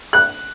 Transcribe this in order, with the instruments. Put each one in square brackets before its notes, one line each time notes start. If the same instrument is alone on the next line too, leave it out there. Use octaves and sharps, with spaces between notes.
[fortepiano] F#6